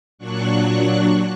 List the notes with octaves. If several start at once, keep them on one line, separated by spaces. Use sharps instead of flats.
A#2 F#3 D4 C#6 F#6